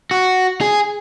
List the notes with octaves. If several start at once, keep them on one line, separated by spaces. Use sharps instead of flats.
F#4
G#4